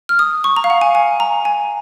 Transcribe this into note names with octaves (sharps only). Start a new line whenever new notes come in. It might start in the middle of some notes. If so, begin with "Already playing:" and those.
F6
D#6
C#6
A#5
F5
F#5
G#5
G#5
A#5
G#5